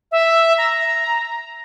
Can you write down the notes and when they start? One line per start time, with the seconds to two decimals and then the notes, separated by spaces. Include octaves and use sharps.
0.12 E5
0.58 A#5